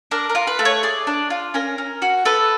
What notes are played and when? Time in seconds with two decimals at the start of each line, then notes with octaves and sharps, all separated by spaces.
0.11 D4 A#4
0.29 A#4
0.35 F4
0.47 B4
0.59 A3
0.65 C#5
0.83 G#4 D5
1.07 D4
1.30 F4
1.54 C#4 A#4
1.78 C#4
2.02 F#4
2.25 A4 B4